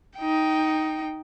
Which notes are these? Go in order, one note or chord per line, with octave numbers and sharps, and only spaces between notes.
D#4 G5